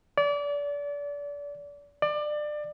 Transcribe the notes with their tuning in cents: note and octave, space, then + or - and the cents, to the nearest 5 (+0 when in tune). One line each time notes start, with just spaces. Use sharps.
D5 -30
D5 +25